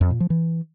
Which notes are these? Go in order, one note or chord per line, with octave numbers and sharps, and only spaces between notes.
F2
A#2
F3
E3